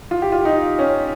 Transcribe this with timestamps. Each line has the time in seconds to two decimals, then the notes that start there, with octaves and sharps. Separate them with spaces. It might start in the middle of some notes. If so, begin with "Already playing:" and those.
0.11 F4
0.22 G4
0.32 F4
0.45 D#4
0.79 C#4